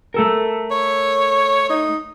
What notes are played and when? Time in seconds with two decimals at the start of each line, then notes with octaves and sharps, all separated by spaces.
0.14 A3 A4 A#4
0.71 C#5
1.70 D#4